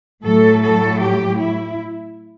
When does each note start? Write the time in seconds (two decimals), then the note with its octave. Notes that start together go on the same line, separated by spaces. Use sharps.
0.24 A2 F#3 A4
0.61 A4
0.99 G4
1.36 E4